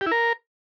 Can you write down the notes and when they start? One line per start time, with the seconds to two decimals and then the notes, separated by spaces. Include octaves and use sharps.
0.01 G4
0.06 E4
0.12 A#4